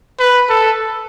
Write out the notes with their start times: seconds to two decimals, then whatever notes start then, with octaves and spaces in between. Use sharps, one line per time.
0.19 B4
0.49 A4